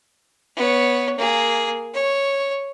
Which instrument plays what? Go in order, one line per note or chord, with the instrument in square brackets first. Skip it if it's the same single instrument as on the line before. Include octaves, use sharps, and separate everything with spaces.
[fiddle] B3 C#5
A#3 G#4
C#5